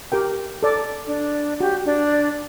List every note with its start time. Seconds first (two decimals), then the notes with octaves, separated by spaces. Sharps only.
0.12 G4 A#4 G5
0.63 A4 D5
1.07 D4
1.61 F#4 G4
1.86 D4